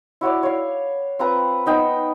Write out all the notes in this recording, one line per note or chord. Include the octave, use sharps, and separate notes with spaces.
E4 F#4 C#5 D5
C#5 F5
C4 F4 B4 A#5
B3 D#4 G5